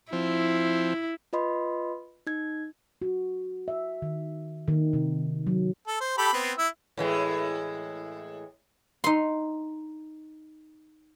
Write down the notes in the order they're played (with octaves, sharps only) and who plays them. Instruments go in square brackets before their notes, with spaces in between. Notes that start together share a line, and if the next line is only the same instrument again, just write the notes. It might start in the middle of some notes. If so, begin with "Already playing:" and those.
[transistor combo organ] F3 C4 [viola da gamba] E4
[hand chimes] F4 B4 D#5 B5 C6
D#4 G#6
[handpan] F#4
E5
D#3
D#3
C3
F#3
[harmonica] A4
C5
G4 A4 B5
B3 C4
E4 E6
[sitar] A2 E3 G#3
[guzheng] D#4 C6